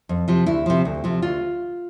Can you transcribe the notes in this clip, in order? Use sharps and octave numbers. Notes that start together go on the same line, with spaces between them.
F2
C3 F3
D2 E4
C3 F3
D2
C3 F3
D2 F4